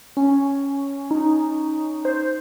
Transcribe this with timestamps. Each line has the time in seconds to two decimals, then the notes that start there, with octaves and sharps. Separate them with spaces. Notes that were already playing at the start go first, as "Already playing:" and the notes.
0.17 C#4
1.11 D#4
2.05 C5